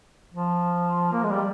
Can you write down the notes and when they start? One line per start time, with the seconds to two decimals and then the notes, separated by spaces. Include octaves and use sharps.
0.34 F3
1.13 A#3
1.23 G#3
1.32 G3